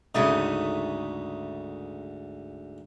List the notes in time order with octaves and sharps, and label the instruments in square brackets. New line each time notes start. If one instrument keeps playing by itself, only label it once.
[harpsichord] D2 G#2 [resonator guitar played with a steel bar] C#3 A3 D#4